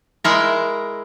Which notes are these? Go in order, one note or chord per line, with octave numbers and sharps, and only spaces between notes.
G#3 E4 A#4